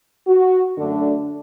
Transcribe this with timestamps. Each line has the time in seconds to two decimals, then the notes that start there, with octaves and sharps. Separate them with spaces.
0.28 F#4
0.77 F#2 D3 A3 D4